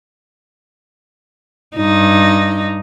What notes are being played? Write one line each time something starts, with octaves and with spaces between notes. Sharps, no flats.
G2 D#4